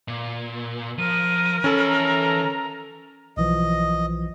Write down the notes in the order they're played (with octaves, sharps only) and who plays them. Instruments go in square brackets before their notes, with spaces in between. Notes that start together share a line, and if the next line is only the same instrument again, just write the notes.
[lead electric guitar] A#2
[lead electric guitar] F3 [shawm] A#4 [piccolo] D#7
[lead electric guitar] E3 B5 [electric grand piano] C#4 A4
[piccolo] A#5
[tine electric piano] B1 E3 F3 [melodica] D#5